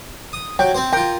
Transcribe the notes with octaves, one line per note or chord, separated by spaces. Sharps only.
D#6
F#3 G5
C4 C5
F4 A#4 G5